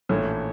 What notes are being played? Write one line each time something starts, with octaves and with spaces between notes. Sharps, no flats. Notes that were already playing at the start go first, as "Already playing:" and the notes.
A#1 A2 E3 A3 C#4